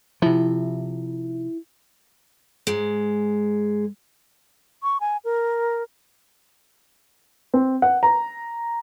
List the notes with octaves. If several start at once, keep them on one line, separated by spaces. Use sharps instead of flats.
C3 F3 E4
G#2 G#3
C#6
G#5
A#4
C4
F#5
A#5